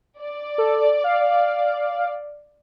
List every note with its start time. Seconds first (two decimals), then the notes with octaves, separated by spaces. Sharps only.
0.21 D5
0.58 A4
1.04 F5